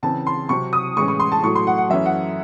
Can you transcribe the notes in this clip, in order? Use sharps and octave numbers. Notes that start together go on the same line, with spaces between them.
C#3 E3 C4 A5
C6
C3 F#3 C4 C#6
D#6
A2 E3 G#3 C#4 C#6
C#6
C6
A5
A2 F#3 A3 C#6
C6
F#5
F#5
F#2 E3 A3 C#4 E5
F#5